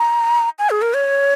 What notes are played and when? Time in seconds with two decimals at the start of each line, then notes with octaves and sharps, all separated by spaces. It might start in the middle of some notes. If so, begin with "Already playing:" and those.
Already playing: A#5
0.59 G#5
0.70 G#4
0.82 A#4
0.94 C#5